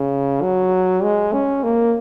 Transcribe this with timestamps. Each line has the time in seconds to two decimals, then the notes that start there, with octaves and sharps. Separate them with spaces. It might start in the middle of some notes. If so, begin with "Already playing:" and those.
Already playing: C#3
0.42 F#3
1.03 G#3
1.33 C#4
1.63 A#3